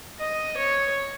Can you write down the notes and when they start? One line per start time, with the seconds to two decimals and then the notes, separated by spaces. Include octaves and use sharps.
0.20 D#5
0.57 C#5